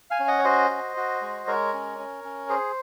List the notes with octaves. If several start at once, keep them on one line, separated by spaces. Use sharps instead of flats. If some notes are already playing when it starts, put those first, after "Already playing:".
F5 G#5
C#4
D#5 F#5
C#5
F#4 C5 D#5
F#4
F#4
G#3
G#3 A#4 C#5
C#4
C#4
C#4
G#4 C5